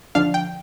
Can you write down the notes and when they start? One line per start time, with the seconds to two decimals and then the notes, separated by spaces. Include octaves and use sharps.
0.15 D3 F3 D4 F5
0.34 G5